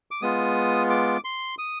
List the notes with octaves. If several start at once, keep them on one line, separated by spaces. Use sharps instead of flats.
D6
G#3 B3 F4 D#6
D6
C6
D#6